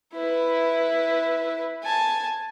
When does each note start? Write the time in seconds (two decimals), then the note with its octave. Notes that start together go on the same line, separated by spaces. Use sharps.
0.14 E4 B4
1.84 G#5 A5